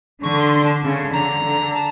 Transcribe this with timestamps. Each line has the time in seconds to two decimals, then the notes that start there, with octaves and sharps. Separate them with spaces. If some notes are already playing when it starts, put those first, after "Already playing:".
0.23 D3 C#6
0.38 C6
0.54 C6
0.63 A5
0.84 C#3
1.13 D3 A#5
1.43 D3
1.74 A5